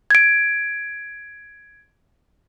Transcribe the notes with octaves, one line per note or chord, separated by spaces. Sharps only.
G#6 D7